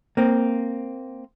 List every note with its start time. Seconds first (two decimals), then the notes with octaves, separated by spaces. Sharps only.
0.17 A#3 C4